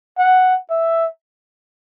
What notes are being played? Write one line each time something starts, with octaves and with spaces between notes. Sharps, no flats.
F#5
E5